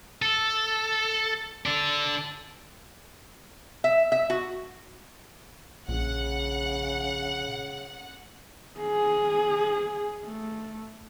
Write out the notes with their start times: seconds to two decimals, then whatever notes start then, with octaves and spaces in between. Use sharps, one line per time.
0.22 A4
1.66 D4 A4
3.84 E5
4.12 E5
4.30 F#4
5.89 A#1 C#3 F#5
8.80 G#4
10.25 A3